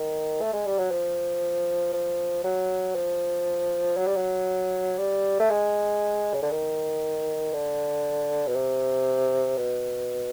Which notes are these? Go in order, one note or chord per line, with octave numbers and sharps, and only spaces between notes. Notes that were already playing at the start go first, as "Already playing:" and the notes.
Already playing: D#3
A3
G#3
G3
F#3
F3
F3
F#3
F3
F#3
G3
F#3
G3
A3
G#3
C#3
D3
D#3
D3
B2
C3
B2